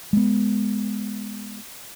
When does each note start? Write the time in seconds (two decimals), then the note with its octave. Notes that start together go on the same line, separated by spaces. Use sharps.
0.13 G#3 B3